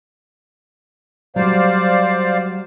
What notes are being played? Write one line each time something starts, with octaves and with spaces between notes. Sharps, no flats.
F#3 G3 C5 D5 F5